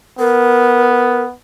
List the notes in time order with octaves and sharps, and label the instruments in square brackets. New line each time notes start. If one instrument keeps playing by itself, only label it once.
[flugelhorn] B3 [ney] A#4